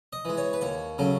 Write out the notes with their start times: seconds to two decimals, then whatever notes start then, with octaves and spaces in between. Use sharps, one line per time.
0.13 D#5
0.25 E3 G#3
0.37 C#5
0.53 B4
0.61 D#2 C#5
0.98 C#3 F#3 A3